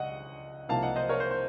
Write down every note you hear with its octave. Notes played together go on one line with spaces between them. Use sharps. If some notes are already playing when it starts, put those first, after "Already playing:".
Already playing: C#2 D#5 F#5
C2 C3 F3 A#3 D#4 F5 A5
D#5 F#5
C5 D#5
A#4 C#5
C5
C5